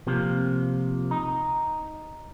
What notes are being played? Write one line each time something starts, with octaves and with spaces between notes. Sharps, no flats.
C3 F3 A#3
D#4